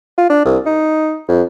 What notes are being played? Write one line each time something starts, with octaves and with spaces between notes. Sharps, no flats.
F4
D4
C2
D#4
F2